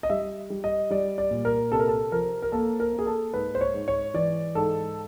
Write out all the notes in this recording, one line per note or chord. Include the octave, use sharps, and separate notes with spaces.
D#5
G3 E5
G3
D#5
G3 D5
D5
A#2
A#4
C3 A4
A#4
A4
F3 A#4
A#4
A#3 A4
A#4
A#3
G#4
A4
G#2 B4
C5
C#5
G#2
C#5
E3 D5
G#2 A4